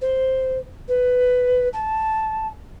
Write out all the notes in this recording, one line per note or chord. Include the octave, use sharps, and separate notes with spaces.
C5
B4
A5